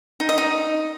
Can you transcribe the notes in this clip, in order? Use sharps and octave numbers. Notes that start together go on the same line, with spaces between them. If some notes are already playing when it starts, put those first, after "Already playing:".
D#4
D#5
D#4